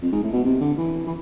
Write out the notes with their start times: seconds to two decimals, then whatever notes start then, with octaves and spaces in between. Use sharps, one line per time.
0.02 F2
0.12 G#2
0.23 A2
0.33 B2
0.44 C3
0.61 D3
0.77 E3
1.07 E3